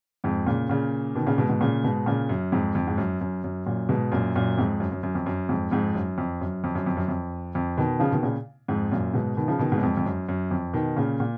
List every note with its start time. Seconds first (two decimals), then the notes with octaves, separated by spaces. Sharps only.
0.24 F2 G#2
0.47 A#2 C#3
0.69 A#2 C#3
1.15 B2 D#3
1.27 A#2 C#3
1.38 G#2 B2
1.49 G#2 B2
1.61 A#2 C#3
1.84 G#2 B2
2.06 A#2 C#3
2.29 F#2
2.52 F2 G#2
2.75 F2
2.87 G#2
2.98 F#2
3.21 F#2
3.44 F#2
3.66 F#2 A#2
3.89 G#2 B2
4.12 F#2 A#2
4.35 F#2 A#2
4.58 F2 G#2
4.80 F#2
4.92 F#2
5.03 F#2
5.15 F2
5.26 F#2
5.49 F2 G#2
5.71 F2 G#2
5.95 F#2
6.18 F2
6.41 F#2
6.64 F2
6.75 F#2
6.86 F2
6.97 F#2
7.08 F2
7.55 F2
7.77 B2 D#3
8.00 C#3 F3
8.11 B2 D#3
8.23 A#2 C#3
8.68 F2 G#2
8.92 F#2 A#2
9.14 G#2 B2
9.37 B2 D#3
9.48 C#3 F3
9.59 B2 D#3
9.72 G#2 B2
9.78 F#2
9.83 F2 G#2
9.97 F2
10.06 F#2
10.29 F#2
10.51 F2
10.73 B2 D#3
10.97 A#2 C#3
11.20 A#2